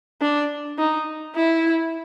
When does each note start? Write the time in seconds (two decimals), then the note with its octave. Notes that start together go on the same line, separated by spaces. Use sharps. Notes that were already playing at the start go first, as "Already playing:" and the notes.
0.21 D4
0.78 D#4
1.35 E4